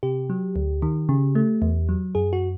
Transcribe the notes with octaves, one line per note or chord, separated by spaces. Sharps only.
C3 G4
F#3
D2
D#3
C#3
A3
E2
F#3
F#2 G#4
F#4